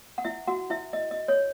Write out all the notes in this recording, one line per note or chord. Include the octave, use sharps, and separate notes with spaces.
F#5
E4 E5
F#4 F#5
E4 E5
D#5
D#5
C#5